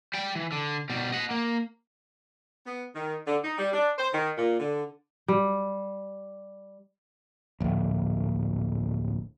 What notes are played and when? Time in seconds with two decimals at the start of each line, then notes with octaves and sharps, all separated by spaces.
0.14 G3 G5
0.35 E3
0.52 D3
0.90 B2 G3
1.12 D#5 F#5
1.31 A#3
2.66 B3
2.95 D#3
3.26 D3
3.43 D#4
3.58 G3
3.73 D4
3.98 C5
4.13 D#3
4.38 A#2
4.59 D3
5.28 G3
7.60 D1 A#1